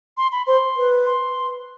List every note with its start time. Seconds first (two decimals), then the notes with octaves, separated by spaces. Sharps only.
0.17 C6
0.32 B5
0.47 C5 C6
0.77 B4
1.06 C6